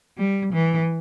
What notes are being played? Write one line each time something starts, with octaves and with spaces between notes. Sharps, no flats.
G3
E3